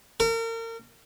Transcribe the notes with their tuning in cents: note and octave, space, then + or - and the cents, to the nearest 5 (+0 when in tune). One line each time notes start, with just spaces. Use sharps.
A#4 -35